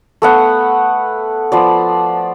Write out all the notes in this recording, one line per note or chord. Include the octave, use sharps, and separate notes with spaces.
A3 B3 F#5
F3 B3 D5